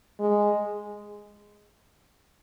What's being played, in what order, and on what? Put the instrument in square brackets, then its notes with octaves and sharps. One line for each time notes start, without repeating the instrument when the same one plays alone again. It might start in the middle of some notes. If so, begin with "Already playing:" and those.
[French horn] G#3